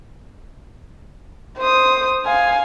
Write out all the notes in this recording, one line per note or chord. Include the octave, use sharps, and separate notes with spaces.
C5 D#6
F5 G#5